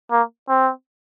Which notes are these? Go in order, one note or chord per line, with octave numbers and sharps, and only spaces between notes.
A#3
C4